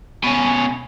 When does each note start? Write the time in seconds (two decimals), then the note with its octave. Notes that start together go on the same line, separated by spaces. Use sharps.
0.24 B2 C#4